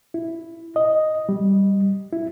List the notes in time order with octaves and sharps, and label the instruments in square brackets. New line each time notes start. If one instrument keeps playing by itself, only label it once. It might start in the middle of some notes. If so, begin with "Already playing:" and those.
[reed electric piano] E4
D#5
G3
E4